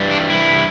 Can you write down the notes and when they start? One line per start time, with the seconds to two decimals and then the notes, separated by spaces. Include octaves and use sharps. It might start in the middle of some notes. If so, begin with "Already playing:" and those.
Already playing: G2 E3 G3
0.11 D4
0.30 E4